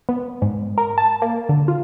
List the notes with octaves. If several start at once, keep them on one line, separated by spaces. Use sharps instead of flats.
B3
G#2
A#4
A5
A#3
D3
F4